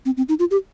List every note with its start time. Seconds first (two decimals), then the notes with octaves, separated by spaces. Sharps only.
0.06 C4
0.17 C4
0.29 D#4
0.39 F4
0.51 G4